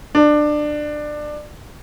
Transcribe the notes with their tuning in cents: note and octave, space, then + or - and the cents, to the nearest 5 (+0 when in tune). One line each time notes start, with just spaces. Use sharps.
D4 +20